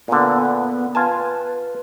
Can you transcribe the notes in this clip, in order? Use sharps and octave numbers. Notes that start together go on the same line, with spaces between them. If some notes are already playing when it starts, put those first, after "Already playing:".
A#2 D3 B3
F4 B4 G#5 A5